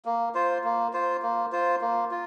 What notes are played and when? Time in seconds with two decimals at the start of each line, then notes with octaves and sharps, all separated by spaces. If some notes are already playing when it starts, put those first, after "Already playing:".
0.05 A#3
0.35 F4 C5
0.64 A#3
0.93 F4 C5
1.22 A#3
1.52 F4 C5
1.81 A#3
2.11 F4